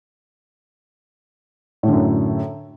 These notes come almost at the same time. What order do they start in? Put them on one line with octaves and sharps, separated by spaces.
A2 D3 F#2